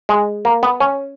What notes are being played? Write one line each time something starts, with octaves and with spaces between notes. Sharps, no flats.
G#3
A#3
B3
C#4